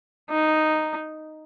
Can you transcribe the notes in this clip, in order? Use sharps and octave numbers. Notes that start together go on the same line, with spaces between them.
D#4